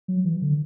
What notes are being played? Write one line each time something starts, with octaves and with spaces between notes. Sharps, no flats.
F#3
E3
D3